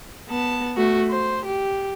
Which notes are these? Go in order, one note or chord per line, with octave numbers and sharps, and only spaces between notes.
B3 A5
A3 F#4
C5
G4